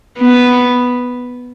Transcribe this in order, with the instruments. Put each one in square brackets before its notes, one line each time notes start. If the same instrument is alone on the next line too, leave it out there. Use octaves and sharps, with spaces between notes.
[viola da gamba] B3